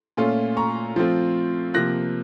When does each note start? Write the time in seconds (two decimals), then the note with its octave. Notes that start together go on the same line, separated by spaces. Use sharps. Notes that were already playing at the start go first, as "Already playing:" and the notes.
0.17 A#2 A3 C#4 F4
0.57 A#5 C#6
0.96 F3 A3 C4 F4
1.74 C3 F3 A#3 F#6 A#6